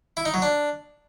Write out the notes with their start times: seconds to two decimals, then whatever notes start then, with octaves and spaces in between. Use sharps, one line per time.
0.17 E4
0.25 D#4
0.34 F#3
0.42 D4